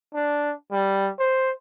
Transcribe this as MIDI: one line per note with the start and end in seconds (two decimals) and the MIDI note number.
0.14 0.53 62
0.72 1.11 55
1.19 1.53 72